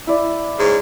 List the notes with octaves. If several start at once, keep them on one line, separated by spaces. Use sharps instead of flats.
E4 D5
G#2 C#3